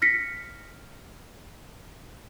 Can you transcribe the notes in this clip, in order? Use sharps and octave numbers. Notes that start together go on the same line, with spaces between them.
F6 A#6 B6 C#7